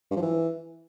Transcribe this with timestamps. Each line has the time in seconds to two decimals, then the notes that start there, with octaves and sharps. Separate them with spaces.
0.11 G2
0.16 F3
0.22 E3